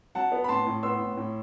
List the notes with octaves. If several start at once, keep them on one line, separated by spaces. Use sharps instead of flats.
F#3 F#5 A5
B3
B5
A2 A5 C6
A2
B3 C6 E6
A2
A2